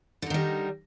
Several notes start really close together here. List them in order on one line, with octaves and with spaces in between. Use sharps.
D3 D#4 D#3 G3